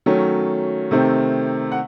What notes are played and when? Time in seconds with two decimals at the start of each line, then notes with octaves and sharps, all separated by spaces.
0.06 D#3 F#3 A3 C#4
0.91 C3 D#3 A3 C4
1.72 F#5